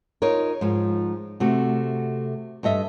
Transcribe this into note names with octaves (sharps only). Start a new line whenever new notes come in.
D#4 F4 A#4 C#5
G#2 F3
C3 A3 F#4
G2 A4 D#5 E5